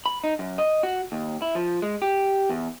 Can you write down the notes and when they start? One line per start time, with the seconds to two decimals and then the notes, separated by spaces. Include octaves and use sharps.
0.06 B5
0.24 D#4
0.39 F#2
0.58 D#5
0.83 F#4
1.12 D#2
1.42 E4
1.55 F3
1.82 G#3
2.02 G4
2.50 E2